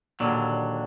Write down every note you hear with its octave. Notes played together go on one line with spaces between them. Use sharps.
D#2 A#2 D3 F#3